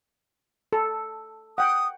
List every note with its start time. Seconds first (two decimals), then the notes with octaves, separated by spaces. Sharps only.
0.73 A4
1.58 F#5 G5 D#6